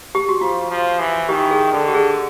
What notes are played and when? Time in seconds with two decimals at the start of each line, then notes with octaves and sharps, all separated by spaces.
0.15 G4
0.29 F#4
0.41 F3 F4
0.71 F3
1.00 E3
1.29 D#3 G4
1.51 G#4
1.72 D3 A4
1.88 G4
1.94 G#4